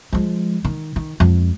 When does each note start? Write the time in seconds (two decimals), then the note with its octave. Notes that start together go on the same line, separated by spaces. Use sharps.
0.13 F3 G#3
0.64 D#3
0.96 D#3
1.20 F2 G#3